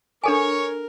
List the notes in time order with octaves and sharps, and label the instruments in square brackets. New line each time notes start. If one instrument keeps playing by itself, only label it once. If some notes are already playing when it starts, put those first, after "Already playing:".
[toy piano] D4 A4 G#5 [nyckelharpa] A#4 [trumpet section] C#5 C#6